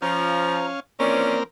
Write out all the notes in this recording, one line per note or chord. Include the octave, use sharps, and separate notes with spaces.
F3 C#4 F5 A#5
E3 F3 A#3 C4 C#4 A#4 D5